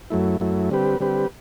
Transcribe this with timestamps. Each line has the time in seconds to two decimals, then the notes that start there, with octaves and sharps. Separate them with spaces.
0.10 F#2 F#3 A3 E4
0.40 F#2 F#3 A3 E4
0.70 D3 G3 C4 G4 B4
1.00 D3 G3 C4 G4 B4